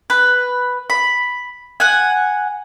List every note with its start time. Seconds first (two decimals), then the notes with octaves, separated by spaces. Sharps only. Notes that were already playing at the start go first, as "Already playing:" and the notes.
0.10 B4
0.90 B5
1.80 F#5 G#5